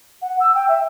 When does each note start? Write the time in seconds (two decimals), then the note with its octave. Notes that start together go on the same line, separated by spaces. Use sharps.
0.22 F#5
0.40 E6
0.55 G5
0.69 E5